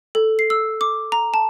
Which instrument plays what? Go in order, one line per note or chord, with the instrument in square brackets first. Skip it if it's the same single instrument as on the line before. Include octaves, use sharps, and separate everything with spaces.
[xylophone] A4
C7
E6
D6
A#5
A5